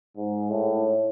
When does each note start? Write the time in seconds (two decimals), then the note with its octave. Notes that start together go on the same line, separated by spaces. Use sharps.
0.17 G#2
0.50 A2